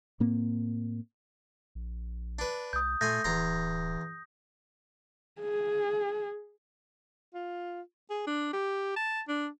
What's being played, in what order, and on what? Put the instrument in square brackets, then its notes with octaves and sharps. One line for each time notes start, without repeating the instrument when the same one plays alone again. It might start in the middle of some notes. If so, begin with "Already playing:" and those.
[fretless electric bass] A2 A#3 C4
[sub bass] A#1
[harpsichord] D4 B4
[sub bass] C2 [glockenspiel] D#6 G6
[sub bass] A#2 [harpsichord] A3 G#5 C6 [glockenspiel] G6 A#6
[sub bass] D1 [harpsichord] E2 A#5 C6 [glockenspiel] A#6
[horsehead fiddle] G#4
[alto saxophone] F4
G#4
D4
G4
A5
D4